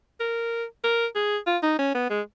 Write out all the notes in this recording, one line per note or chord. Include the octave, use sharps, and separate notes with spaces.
A#4
A#4
G#4
F4
D#4
C#4
B3
G#3